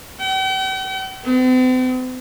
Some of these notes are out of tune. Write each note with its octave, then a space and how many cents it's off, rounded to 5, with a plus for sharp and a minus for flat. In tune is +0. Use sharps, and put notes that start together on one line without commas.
G5 -45
C4 -45